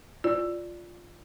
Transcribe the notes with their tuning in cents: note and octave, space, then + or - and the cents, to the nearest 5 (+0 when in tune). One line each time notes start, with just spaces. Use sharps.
F4 +0 D5 +0